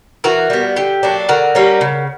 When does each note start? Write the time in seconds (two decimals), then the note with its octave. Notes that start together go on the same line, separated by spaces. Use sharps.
0.24 E3 F#4 A#4
0.50 G3 B3
0.76 D3 G4
1.03 F#3 A#3 D4
1.29 D3 F#4 A#4
1.55 G3 A#3 C#4
1.81 C#3